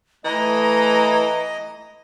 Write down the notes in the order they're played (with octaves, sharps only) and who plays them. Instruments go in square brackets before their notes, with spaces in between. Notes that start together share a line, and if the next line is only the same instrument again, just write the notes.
[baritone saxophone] E3 [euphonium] A3 [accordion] D#5 [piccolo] A#5